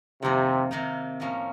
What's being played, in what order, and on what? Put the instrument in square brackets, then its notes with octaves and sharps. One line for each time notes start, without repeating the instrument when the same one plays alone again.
[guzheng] F2 D#3 A#3 [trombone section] C3
[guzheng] C3 D#3 A#3 D#4
A2 F3 A#3 C#4